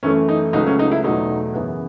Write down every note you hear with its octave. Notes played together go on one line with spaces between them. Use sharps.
F#2 E3 A3 C#4
D#4
C#2 C#3 F#3 A3 D#4
C#4
D#4
E4
E2 B2 F#3 A3 D#4
F#2 C#3 E3 B3